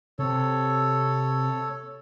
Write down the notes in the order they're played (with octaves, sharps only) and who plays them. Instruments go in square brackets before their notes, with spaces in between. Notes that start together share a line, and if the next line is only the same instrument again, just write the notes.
[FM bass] C3 [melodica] A4 C#5